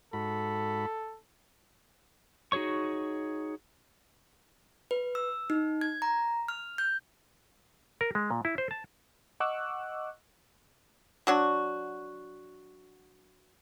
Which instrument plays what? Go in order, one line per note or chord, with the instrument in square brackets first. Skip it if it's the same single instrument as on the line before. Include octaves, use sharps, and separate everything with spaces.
[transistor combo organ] G#2 F#4 B5 [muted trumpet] A4
[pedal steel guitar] D#4 F#4 G#4 C#5 C#6
[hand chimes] B4
E6
D#4
G#6
A#5
F6
G6
[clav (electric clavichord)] A#4
G#3
A#2
E4
C5
A5
[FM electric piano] D#5 F#5 C#6 D6 E6 F#6
[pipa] F#3 D4 F#4